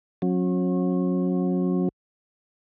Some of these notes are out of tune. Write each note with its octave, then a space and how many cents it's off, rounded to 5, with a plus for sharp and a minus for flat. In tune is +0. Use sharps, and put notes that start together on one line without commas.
F#3 -30 C#4 -35